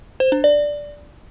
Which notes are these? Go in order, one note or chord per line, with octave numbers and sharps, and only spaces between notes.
C5
D4
D5